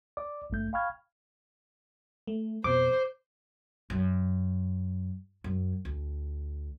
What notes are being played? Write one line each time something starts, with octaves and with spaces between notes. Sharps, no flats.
D5 D6
G#1 G2 A3 G6
F5 G5 B5 C#6 F6 G#6
A3
F2 B2 C5 D6
F#2
F#2
D2